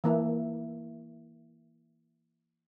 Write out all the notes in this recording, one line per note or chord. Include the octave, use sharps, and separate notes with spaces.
E3 A#3 E4